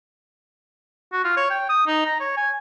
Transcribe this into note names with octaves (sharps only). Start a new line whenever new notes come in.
F#4
F4
C#5
G5
D#6
D#4
A#5
C#5
G#5